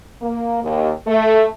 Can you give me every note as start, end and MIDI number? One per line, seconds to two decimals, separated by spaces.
0.22 0.60 58
0.63 0.91 39
1.07 1.46 57